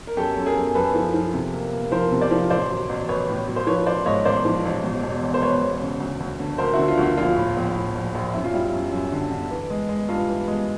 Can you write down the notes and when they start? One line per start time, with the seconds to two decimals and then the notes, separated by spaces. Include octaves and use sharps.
0.07 A#4
0.17 F#2 G4 A4
0.37 F#2
0.46 G#4 A#4
0.56 F#2
0.75 F#2 A4 B4
0.95 F3
1.14 F3
1.34 C3
1.53 A#3
1.73 A#3
1.92 F3 A#4 C5
2.12 C3
2.21 C5 D5
2.31 F3
2.50 A1 C5 D5
2.70 F#3
2.89 A1
3.09 A1 B4 C#5
3.28 A2
3.48 F#3
3.56 C5
3.67 F3 B4 C#5
3.86 A1 C5 D5
4.06 G#2 C#5 D#5
4.25 A1 C5 D5
4.45 F3
4.65 A1
4.84 E1
5.03 E1
5.23 E2
5.34 C5
5.42 E1 B4 C#5
5.61 E1
5.81 C#3
6.00 D2
6.20 D2
6.40 D3
6.58 D2 A#4 C5
6.73 E4 F#4
6.79 D3
6.88 F4
6.97 D2 F#4
7.03 F4
7.17 A#1 F4
7.36 A2
7.56 A#1
7.76 A2
7.95 A#1
8.15 A#1
8.34 F#2 E4
8.44 F4
8.54 G3 E4
8.73 F#2
8.92 F#2
9.12 D3
9.31 D3
9.51 E3
9.70 G#3
9.89 G#3
10.09 G2 F4
10.28 E3
10.48 G#3